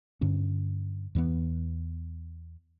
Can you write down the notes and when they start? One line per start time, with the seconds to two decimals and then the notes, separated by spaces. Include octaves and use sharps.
0.21 G2 D3 C#4
1.15 E2 E3 F3 B3